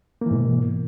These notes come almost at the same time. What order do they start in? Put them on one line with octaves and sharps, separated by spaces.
A#3 E3 G#2 B2